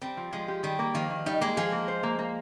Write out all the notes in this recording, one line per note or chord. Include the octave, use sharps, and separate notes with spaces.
G3 C4
F3
F3 G#3
G4
D#3 G3
A#3
D#3 F3
D#3
G3 D#4
G#3 A#3
F3 G#4
A#3
C5
A#3
A#3